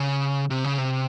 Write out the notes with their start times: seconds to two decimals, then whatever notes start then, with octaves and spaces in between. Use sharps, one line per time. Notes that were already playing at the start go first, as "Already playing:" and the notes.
Already playing: C#3
0.50 C3
0.64 C#3
0.78 C3